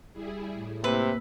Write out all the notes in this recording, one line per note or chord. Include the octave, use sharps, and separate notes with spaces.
G3 E4 G#4
A2
C3 A#3 B4 E6